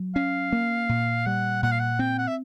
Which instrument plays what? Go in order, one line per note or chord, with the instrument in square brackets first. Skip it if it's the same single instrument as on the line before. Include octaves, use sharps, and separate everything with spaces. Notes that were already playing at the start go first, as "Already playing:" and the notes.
Already playing: [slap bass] F#3
[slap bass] C#4 [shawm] F5
[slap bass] A#3
A#2
[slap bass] G3 [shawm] F#5
[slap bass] A#2 [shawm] F#5
[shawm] F5
F#5
[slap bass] C4 [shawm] G5
[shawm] F#5
E5